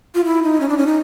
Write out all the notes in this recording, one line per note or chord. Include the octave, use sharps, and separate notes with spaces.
F4
E4
D#4
C#4
D4
C#4
D#4